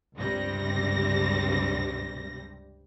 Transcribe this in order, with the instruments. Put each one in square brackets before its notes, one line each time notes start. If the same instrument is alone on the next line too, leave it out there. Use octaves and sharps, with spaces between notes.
[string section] C#2 G2 C3 G3 A#6